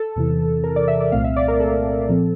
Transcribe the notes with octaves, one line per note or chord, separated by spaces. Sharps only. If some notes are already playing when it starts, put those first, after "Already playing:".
Already playing: A4
E2 C3 E3
A#4
D5
E5
D5
C2 A#2 A3 C4 F5
E5
D5
A#4
A4
A#2 F3 C4